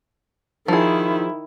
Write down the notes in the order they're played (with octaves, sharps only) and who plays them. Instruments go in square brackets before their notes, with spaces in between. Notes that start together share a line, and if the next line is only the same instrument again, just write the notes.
[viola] D#3 E4 [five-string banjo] F3 G#4